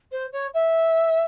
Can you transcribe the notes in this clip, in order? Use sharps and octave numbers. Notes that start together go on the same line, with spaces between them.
C5
C#5
E5